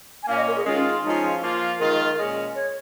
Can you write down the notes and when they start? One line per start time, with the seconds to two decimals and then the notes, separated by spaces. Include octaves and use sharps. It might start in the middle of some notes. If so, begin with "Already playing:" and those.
0.23 G#5
0.28 A#2 A#3 C#4 F5
0.37 D#5
0.47 A#4
0.56 G#4
0.66 D#3 G#3 C#4 F4
1.03 F3 G#3 C#4 D#4 F4
1.41 F3 A#3 F4
1.79 D#3 G#3 F4 A#4
2.18 A#2 G#3 C#4
2.55 C#5